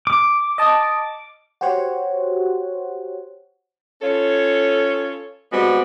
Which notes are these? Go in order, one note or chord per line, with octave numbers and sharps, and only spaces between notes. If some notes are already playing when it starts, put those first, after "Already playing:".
D6
D#5 A5
F#4 G4 C5 C#5 F#5
C#4 F4 A4 C#5
G3 G#3 B3 C4 F#4